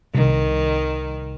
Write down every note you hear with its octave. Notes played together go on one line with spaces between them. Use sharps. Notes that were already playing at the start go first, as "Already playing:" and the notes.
C2 D#3